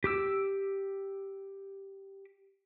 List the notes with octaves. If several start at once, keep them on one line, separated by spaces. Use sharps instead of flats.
G4 D6 E6